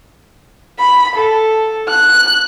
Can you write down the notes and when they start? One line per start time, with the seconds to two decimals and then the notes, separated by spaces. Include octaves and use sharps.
0.79 B5
1.15 A4
1.89 F#6